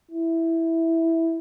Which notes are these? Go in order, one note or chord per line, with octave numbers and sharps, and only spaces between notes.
E4